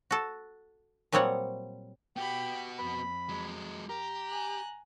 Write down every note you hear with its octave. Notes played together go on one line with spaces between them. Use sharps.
F#4 A4
A#2 F#3 G3 C4 C#5 F#5
B3 F#4 G4 G5 B5
F2 B5
F#3 G#3
G4 A#5
G#5 F#6